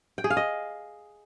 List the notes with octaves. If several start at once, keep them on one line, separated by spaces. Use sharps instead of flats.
G5
G#4
F5
D#5